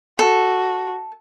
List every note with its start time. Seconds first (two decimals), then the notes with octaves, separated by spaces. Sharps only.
0.19 F#4 A4